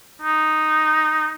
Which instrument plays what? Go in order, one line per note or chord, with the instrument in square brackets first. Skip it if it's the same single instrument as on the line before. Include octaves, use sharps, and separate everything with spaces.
[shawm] D#4